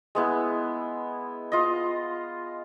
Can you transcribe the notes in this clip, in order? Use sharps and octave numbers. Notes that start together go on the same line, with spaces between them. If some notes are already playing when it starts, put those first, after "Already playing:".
G#3 B3 E4
F4 D#5